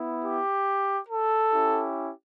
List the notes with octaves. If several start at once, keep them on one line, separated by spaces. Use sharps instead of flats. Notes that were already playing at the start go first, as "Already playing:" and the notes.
Already playing: B3 E4
G4
A4
C#4 E4 G4